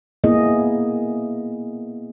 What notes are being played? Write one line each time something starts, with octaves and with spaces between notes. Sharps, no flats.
A#3 B3 E4 G#4 D#5